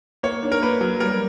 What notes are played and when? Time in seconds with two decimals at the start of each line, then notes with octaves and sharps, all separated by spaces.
0.23 A#3 C#5
0.43 D4
0.52 A#4
0.62 A#3 B4
0.81 F#3
1.00 G3 A#4